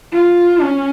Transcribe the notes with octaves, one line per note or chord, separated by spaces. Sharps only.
F4
C#4